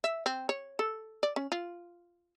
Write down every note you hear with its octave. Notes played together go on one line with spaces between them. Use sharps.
E5
C4
C#5
A4
D5
C#4
F4